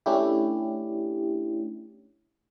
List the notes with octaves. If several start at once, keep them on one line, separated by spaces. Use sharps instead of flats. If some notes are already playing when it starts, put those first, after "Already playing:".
A3 C#4 D4 E4 G4